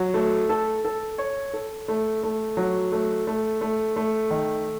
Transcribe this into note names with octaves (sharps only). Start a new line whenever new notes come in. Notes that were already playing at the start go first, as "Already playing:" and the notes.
Already playing: F#3
A3
A4
A4
C#5
A4
A3
A3
F#3
A3
A3
A3
A3
D#3